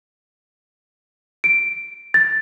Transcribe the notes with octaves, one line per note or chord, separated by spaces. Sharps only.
D7
A6